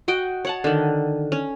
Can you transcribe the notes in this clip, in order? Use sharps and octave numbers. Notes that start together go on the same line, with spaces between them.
F#4 D#5 G5
C#5 F#5 A5
D3 D#3
C#4